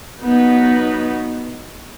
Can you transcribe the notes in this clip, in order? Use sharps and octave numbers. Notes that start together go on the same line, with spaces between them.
F#3 B3 D#4